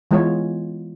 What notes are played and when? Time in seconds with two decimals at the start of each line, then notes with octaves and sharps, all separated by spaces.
0.11 E3 G#3 B3 F4 C#5